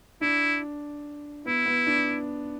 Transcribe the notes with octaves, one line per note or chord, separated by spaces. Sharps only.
D4 E4
B3 E4
B3
D4